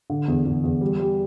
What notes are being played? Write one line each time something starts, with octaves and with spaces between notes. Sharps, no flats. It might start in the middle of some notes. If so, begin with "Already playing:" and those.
D3
E2
E2
E2
G3
G3